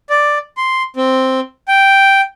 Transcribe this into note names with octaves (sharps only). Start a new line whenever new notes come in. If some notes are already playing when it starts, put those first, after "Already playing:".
D5
C6
C4
G5